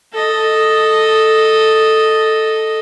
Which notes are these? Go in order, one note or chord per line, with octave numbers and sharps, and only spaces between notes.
A4 D#5